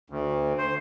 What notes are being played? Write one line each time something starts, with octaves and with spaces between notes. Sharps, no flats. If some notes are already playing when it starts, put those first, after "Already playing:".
D2
C5